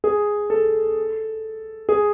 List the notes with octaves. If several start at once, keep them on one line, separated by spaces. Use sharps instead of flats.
G#4
A4
G#4